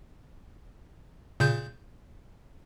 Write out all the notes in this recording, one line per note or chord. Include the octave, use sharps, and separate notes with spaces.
A#2 C#3 G6